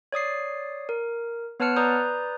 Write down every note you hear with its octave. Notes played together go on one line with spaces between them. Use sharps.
C#5 D5 D#6 C7
A#4
B3 B4 C#5 A5 F6 C#7
B4 D5 A#5 D#6 G6